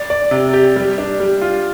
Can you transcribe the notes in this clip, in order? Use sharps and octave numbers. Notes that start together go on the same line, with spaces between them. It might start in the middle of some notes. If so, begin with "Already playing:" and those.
Already playing: D5
D5
C3
G4
G3
D4
G3
F4